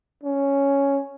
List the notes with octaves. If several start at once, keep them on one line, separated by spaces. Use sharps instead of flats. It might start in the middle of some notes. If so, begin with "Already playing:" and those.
C#4